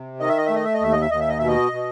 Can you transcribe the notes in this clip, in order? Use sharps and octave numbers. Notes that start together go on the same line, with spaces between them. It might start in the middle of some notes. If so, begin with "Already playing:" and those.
Already playing: C3
D#3 D#5
E5
D#5
A3 E5
D#5
E5
D#5
D#2 E5
D#5
E5
D#2 D#5
E5
D#5
B2 E5
D#5
B2